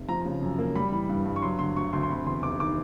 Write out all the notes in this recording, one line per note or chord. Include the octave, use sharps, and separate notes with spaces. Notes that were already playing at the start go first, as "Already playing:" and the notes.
Already playing: F1
F3 A#5
C#3
F#2
A#3
G3 B5
E3
G2
G2
C#6
F#3 C6
D3 C6
D2 C#6
D2 C6
C6
C3 B5
E2 C6
F1 D6
D#3 D6